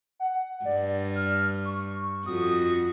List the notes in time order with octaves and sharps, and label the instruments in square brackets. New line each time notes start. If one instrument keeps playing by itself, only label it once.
[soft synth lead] F#5
[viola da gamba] G2 [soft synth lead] D5
[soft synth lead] F6
C#6
[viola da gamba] F2 F#4 [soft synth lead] D#6